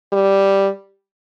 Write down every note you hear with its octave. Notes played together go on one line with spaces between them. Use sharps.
G3